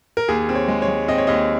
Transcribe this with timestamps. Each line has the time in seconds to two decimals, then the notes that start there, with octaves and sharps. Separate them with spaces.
0.17 A#4
0.28 D#2 G#4
0.49 C4
0.55 C#5
0.68 G#3
0.82 C#5
0.88 G#3
1.08 C4 D#5
1.18 C#5
1.27 D#2 D#5